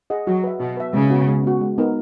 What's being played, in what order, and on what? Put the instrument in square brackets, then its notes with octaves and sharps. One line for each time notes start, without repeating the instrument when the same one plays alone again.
[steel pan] G#4 D#5 F#5
[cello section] F#3 [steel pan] F#4
[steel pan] B4 E5
[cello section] B2 [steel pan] F#4
[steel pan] B4 E5
[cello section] C#3 [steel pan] G#3
[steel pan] B3 F#4
G#3
B3 F#4
G#3
B3 D#4 A#4